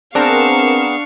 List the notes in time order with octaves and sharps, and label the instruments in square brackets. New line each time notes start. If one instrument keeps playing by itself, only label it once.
[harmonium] B3 G#4 [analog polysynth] C4 A#4 E7 [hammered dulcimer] D4 [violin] F5 C#6